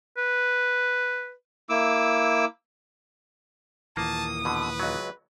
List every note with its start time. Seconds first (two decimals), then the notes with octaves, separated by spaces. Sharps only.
0.18 B4
1.69 A#3 E4 D6 E6
3.97 D#2 A#2 E3 A#3 A5 D#6
4.45 B2 D3 B4
4.80 C#2 F#3